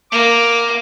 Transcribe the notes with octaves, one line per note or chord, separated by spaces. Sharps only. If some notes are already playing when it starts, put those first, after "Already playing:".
A#3 D6